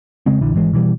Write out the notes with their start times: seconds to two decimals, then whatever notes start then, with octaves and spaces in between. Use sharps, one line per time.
0.26 C#3 G#3 C4
0.41 A#1 D3 E3
0.55 G#1 E3 G#3
0.73 B2 E3 G3